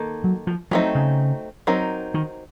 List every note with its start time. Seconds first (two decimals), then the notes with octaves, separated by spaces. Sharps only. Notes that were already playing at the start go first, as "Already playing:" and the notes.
Already playing: D#3 A#3 D#4 A4
0.24 F#3
0.47 F3
0.71 F3 F#3 A3 C4 D#4
0.95 C#3
1.67 F#3 C4 D#4 A#4
2.14 D#3